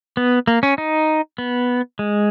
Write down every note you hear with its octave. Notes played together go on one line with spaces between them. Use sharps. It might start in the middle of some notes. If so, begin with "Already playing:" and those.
B3
A#3
C#4
D#4
B3
G#3